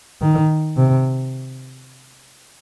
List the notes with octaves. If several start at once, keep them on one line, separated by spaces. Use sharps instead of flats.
D#3
C3